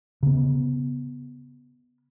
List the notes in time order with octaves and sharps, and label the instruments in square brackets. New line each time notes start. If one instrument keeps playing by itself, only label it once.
[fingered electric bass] C#3 B3